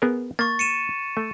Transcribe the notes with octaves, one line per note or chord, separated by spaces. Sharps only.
B3 G#4 A#4
A#3 C#6 A6
C#7 D#7 E7
A3